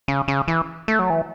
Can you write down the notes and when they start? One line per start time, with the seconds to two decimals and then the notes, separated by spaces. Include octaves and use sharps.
0.08 C#3
0.28 C#3
0.48 E3
0.88 A3
0.99 F#3
1.10 E3